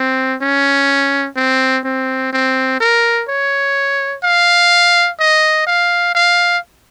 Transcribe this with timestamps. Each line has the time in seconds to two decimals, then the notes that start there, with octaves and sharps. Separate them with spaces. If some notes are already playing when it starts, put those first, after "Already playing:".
Already playing: C4
0.41 C#4
1.36 C4
1.85 C4
2.33 C4
2.80 A#4
3.29 C#5
4.23 F5
5.20 D#5
5.67 F5
6.15 F5